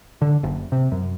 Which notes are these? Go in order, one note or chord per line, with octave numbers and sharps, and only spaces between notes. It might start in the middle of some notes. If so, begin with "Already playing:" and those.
D3
F#1
C3
F#2